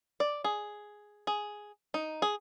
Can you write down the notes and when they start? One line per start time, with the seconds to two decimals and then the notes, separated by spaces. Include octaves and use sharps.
0.20 D5
0.44 G#4
1.27 G#4
1.94 D#4
2.22 G#4